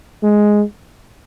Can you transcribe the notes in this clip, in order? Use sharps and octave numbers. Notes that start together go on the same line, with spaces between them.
G#3